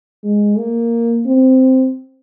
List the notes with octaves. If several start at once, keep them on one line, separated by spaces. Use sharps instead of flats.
G#3
A#3
C4